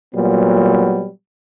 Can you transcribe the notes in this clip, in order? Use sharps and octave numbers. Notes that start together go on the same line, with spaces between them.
A#2 F#3 G3 B3